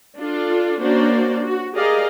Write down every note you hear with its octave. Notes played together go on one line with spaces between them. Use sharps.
D4 F4 A4
A#3 C#4 D4 F#4 C5 D5
F#4
G4 G#4 A#4 D5 D#5 F5